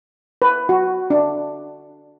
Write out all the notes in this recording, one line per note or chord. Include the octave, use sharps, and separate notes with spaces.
B4
F#4
D4